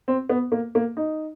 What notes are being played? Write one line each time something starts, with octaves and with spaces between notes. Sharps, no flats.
C4
B3
A#3
A#3
D#4